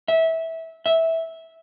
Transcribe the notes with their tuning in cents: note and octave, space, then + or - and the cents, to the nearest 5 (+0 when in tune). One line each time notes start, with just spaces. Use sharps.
E5 -20
E5 -10